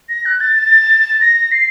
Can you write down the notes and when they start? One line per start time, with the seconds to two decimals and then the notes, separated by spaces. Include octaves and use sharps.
0.09 A#6
0.26 F#6
0.41 A6
0.56 A6
1.21 A#6
1.52 C7